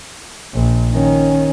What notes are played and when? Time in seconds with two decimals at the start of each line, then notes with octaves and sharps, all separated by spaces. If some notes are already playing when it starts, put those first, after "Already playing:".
0.54 A#1
0.92 D#3 C#4